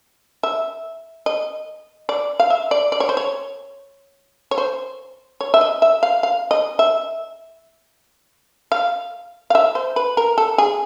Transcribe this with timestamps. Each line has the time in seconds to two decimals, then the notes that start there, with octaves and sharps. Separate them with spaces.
0.43 E5
1.26 D#5
2.09 D5
2.40 F5
2.50 E5
2.71 D5
2.92 D5
3.00 C#5
3.09 C5
3.17 C#5
4.51 C#5
4.58 C5
5.41 C#5
5.54 E5
5.61 D#5
5.82 E5
6.03 F5
6.23 F5
6.51 D#5
6.79 E5
8.72 F5
9.50 F5
9.55 E5
9.75 C5
9.96 B4
10.17 A#4
10.38 A4
10.58 G#4